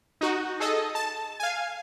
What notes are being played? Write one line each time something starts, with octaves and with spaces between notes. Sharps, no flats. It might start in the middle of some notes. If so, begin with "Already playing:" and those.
D#4 F#4
G#4 A4 D#5
A5
F5 G#5